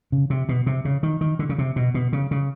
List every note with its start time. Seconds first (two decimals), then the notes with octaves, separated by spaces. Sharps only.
0.12 C#3
0.30 C3
0.49 B2
0.66 C3
0.85 C#3
1.03 D#3
1.21 D#3
1.39 D3
1.49 C#3
1.58 C3
1.76 B2
1.94 B2
2.13 C#3
2.31 C#3